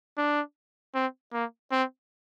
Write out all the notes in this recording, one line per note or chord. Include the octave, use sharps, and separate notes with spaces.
D4
C4
A#3
C4